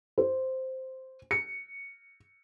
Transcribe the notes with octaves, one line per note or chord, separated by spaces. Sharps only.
C5
C#7